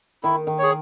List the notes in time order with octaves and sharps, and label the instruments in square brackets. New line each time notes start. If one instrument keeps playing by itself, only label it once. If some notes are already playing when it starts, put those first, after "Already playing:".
[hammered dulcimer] D#3 [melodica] E4
[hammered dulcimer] D#3
[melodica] G#4 C#5